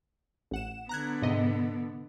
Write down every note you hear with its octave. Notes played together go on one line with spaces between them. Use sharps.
A1 F#5 E7
D3 B3 A#5 F#6 G#6
G#2 C3 D#5